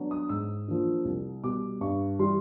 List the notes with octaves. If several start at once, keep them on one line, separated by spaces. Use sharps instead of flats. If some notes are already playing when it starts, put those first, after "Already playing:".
Already playing: F#3 B3 D4
D#6
G#2 E6
F3 A#3 D4
C2
B2 G3 D6
G2 C#6
E3 G3 C6